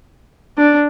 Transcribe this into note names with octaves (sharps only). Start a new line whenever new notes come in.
D4